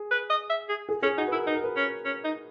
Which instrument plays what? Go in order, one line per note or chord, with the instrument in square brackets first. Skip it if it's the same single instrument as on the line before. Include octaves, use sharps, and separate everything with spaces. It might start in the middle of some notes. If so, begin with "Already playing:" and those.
Already playing: [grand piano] G#4
[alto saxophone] B4
D#5
E5
G#4
[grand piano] G#4
[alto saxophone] C#4 [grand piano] G#4
[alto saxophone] D#4 [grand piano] F#4
[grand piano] B4
[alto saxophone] E4 [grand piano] A#4
[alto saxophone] D#4 [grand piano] B4
[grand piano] A#4
B4
[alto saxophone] C#4
C#4
D#4